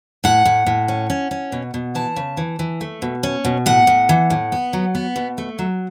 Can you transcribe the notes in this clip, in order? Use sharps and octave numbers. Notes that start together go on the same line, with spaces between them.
A2 F#5
A2
A2
C#4
C#4
C#4
B2
B2
E3 A5
C#3
E3
E3
A3
B2
C#4
B2
A2 F#5
A2
E3
A2
B3
F#3
B3
B2
A3
F#3